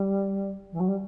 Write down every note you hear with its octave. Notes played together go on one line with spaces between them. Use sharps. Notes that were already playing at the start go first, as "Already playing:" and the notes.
Already playing: G3
E3
F#3
G3